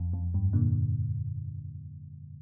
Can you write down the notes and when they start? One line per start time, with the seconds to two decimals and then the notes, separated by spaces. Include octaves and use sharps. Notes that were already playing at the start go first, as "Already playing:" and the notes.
Already playing: F2
0.13 F2
0.34 G2
0.53 A#2 D3